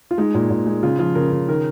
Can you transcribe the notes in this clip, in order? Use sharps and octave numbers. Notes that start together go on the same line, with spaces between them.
F4
G#3 D#4
A#2
A#2
G#3
C#3 F4
F3 F4
C#3 A#4
C#3
D#3 A#4